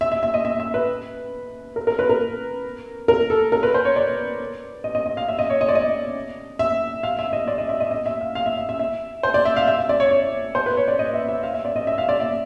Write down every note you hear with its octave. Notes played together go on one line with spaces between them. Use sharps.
E5
E5
E5
D#5
E5
E5
B4
A#4
A#4
B4
A#4
A#4
A4
A#4
B4
C5
C#5
D5
D#5
D#5
D#5
F5
E5
D#5
C#5
D#5
D5
D#5
E5
F5
E5
D#5
D5
D#5
E5
D#5
D#5
E5
F5
F5
E5
E5
E5
E5
C5
D5
E5
F5
E5
E5
D5
C#5
C#5
C5
B4
C#5
D5
D#5
E5
E5
F5
E5
D5
D#5
E5
F5
D5
E5